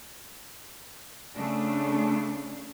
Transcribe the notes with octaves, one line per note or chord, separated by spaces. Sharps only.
C#3 A3 D4